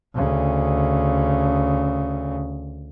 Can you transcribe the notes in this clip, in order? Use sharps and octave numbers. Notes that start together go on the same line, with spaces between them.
D2 C#3